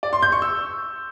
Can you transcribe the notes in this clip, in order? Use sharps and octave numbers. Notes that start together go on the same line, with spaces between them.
D5
C6
G6
C#6
E6